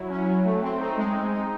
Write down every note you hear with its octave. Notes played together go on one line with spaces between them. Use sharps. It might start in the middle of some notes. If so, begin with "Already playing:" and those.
Already playing: F#3 E4
C#4
F#3
A3
C4
D#4
G#3
C4
D#4